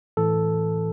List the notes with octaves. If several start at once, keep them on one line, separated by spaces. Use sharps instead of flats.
A2 E3 A4